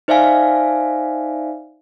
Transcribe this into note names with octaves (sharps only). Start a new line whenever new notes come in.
D#4 C5 D5 E5 F5 G#5